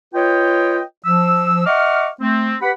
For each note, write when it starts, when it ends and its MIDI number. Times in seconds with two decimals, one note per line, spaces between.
0.14 0.81 65
0.14 0.81 71
0.14 0.81 73
0.14 0.81 75
0.14 0.81 79
1.06 1.64 53
1.06 1.64 88
1.66 2.09 75
1.66 2.09 76
1.66 2.09 78
1.66 2.09 85
1.66 2.09 86
1.66 2.09 89
2.20 2.56 57
2.20 2.56 60
2.61 2.71 67
2.61 2.71 71
2.61 2.71 78
2.61 2.71 83